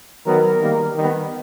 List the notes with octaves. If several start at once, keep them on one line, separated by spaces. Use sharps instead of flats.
D#3 F#3 B3 A#4
D#3 G3 A#3
D#3 G3 B3